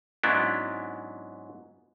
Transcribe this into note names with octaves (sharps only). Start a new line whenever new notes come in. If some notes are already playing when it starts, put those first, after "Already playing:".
G#2 F#3 B3 C#4 D4 E4